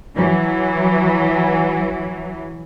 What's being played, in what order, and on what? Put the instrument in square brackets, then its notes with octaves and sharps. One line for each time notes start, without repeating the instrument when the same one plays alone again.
[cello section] E3 F#3